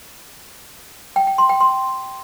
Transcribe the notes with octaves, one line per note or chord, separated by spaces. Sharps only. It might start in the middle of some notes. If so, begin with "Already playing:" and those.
G5
G5
C6
G5
C6